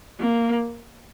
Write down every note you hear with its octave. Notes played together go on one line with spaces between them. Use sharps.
A#3